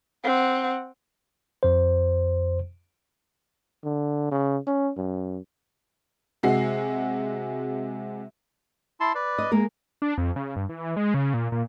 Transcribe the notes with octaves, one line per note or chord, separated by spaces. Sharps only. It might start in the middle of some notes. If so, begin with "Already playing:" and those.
C4 F#5
F2 C5
D3
C#3
C#4
F#2
C3 G#3 F#4 C7
E4 A5 C6
B4 D5
D#5
G#3 A#3 A#4
D4
F2
C#3
G2
E3
G#3
C#3
A#2
A#2